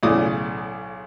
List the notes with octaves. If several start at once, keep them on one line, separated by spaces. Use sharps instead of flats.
B1 A2 C#3 E3 D5 D#6